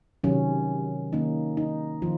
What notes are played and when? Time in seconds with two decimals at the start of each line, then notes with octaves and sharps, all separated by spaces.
0.24 C3 D#3 F#3 C#4
1.13 D#3 A#3 C#4 D#4
1.57 D#4
2.02 D#3 F3 F4